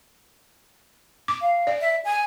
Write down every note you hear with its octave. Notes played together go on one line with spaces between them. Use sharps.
D6
F5
D5
E5
G#5